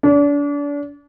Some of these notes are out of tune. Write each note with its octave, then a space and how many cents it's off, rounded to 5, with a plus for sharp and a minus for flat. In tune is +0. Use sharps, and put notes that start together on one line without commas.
D4 -35